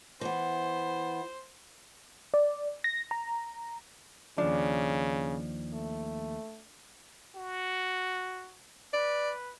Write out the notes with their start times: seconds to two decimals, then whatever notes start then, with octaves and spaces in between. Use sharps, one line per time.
0.21 E3 B3 C5
2.34 D5
2.84 A#6
3.11 A#5
4.38 D#2 C#3 F3 D4
5.74 A3
7.36 F#4
8.94 B4 D5